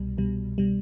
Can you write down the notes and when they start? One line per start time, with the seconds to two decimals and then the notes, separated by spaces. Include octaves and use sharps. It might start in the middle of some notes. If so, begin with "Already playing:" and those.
Already playing: C2 B2 G3
0.17 C2 B2 G3
0.58 B2 G3